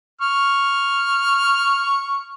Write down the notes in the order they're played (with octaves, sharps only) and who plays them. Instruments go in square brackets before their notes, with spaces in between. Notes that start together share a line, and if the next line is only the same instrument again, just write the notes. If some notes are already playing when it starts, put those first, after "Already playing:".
[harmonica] C#6 F6